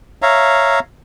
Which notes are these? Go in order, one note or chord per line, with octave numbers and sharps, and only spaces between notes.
C#5 E5 F5 A#5